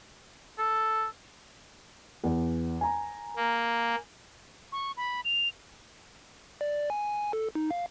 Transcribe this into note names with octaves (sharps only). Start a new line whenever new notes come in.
A4
E2
G#5 A#5
A#3
C#6
B5
F7
D5
G#5
A4
D#4
F5